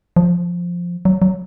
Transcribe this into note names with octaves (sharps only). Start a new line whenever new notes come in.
F3
F#3
F#3